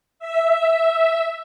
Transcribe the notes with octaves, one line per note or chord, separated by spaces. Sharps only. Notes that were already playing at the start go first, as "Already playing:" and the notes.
E5